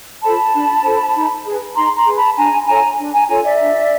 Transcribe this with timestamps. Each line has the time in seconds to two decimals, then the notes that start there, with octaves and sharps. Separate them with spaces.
0.22 F4 A4 C5 A5 B5
0.54 D4
0.83 F4 A4 C5
1.14 D#4
1.45 G#4 B4
1.75 D#4 A#5 C6
1.96 A#5 C6
2.06 G#4 B4
2.16 A5 B5
2.36 D4 G#5 A#5
2.67 F4 A4 C#5 G#5 A#5
2.98 D4
3.13 G#5 A#5
3.28 F4 A4 C#5 G#5 A#5
3.43 D5 E5
3.60 D4